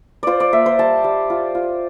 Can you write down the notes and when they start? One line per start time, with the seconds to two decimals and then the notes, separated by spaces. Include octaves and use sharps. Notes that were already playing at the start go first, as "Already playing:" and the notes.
0.23 F4 C5 D5
0.40 D5
0.52 A#3 E5
0.66 C5
0.79 G3 A5
1.04 G3
1.30 F4
1.55 F4